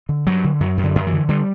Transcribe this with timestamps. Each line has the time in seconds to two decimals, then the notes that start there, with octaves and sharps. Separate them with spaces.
0.09 D3
0.27 G2 F#3
0.44 D3
0.60 F#2 F#3
0.78 F#2
0.83 D3
0.95 F#2
1.07 E3
1.12 D3
1.28 D3 G3